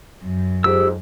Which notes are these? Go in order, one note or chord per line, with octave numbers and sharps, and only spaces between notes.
F#2
F2 G#2 G4 E6